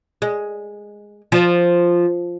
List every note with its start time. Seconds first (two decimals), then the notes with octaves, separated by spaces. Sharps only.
0.22 G#3
1.32 F3